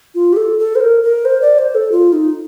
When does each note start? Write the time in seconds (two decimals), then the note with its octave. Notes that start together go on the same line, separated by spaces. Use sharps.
0.15 F4
0.33 G4
0.36 A4
0.59 A4
0.75 C5
0.80 A#4
1.03 A#4
1.25 C5
1.42 D5
1.58 C5
1.75 A4
1.92 F4
2.12 D#4